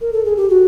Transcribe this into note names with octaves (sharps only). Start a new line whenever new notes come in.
A#4
A4
G#4
G4
F#4